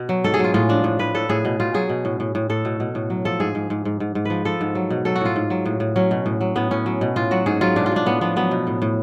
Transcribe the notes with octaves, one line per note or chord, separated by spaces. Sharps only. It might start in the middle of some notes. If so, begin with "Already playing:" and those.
Already playing: B2
F#3
G#2 A4
G#4
F#3 F4
A2 F4
F3 D4
A2
A2 B4
A2 A4
A2 G#4
B2
B2 F4
F#3 G#4
B2
A2
A2
A2
A2 A4
B2
B2
A2
F#3
F3 A4
G#2 G#4
G#2
G#2
G#2
G#2
G#2
F3 B4
F3 A4
G#2
F#3
B2
F#3 A4
F#4
A2 F4
G#2
F#3
A2
A2
F#3 C#4
B2
A2
F#3
A2 B3
A2 C#4
F#3
B2
A2 F4
F#3 F#4
G#2 G#4
F#3 F4
B2 D4
F4
B2 D4
A2 B3
F3 B3
F#3 B3
B2
A2
A2